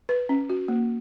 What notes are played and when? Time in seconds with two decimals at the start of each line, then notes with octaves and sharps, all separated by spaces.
0.09 B4
0.29 C#4
0.50 F#4
0.68 A#3